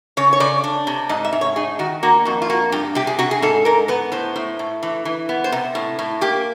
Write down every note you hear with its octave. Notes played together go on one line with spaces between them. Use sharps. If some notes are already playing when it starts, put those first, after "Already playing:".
C#3 C#5
C#5
C#3 D5
D4
C3
G#2 D#5
E5
G#2
C#5
D#4 G#4
D#3 F#4
A#3 F#4
F2 F#4
F4
A#3 F#4
G2 G4
C3 G4
G#4
C3 F#4
G#4
G#2 A4
G#2 A#4
B3 B4
A2 C5
A2
A2
E3
E3
B3
C5
C3
A2
A2
A#3 G4